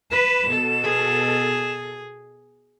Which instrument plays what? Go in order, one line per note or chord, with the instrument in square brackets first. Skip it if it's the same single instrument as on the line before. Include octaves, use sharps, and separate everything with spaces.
[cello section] B4 [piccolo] E7
[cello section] B2 A4
[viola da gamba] G#4